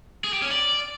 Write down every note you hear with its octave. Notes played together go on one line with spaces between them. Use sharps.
G#4
G4
C#4
D5